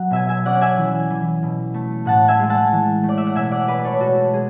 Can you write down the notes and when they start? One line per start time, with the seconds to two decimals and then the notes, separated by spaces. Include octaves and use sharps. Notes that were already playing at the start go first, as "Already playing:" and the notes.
Already playing: F#3 F#5
0.11 B2 E5 G#5
0.29 E5 G#5
0.45 C#4 D5 F#5
0.61 E5 G#5
0.78 E3
1.10 E3
1.43 B2
1.74 A3
2.05 A2 F#5 A5
2.28 E5 G#5
2.40 G#3
2.50 F#5 A5
2.72 E3
3.03 A3
3.09 D5
3.18 E5
3.27 F#5
3.35 B2 E5 G#5
3.51 D5 F#5
3.67 G#3 B4 D5
3.79 D5
3.85 A4 C#5
4.00 B2 F#4 A4
4.33 G#3 G#4